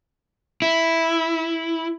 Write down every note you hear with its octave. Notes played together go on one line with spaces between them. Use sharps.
E4